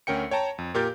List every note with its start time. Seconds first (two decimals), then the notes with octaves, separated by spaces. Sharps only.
0.07 D2 C#4 A#4 G5 C#7
0.31 C#5 G5 A5 A#5
0.58 F2
0.74 A#2 G4 A#4 D6 G6 A6